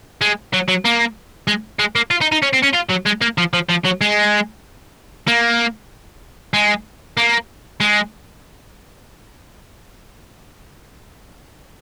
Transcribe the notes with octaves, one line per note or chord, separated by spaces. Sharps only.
G#3
F#3
F#3
A#3
G#3
G#3
A#3
F4
D#4
D#4
C#4
C4
C#4
F4
F#3
G#3
A#3
F3
F3
F3
F#3
G#3
A#3
G#3
A#3
G#3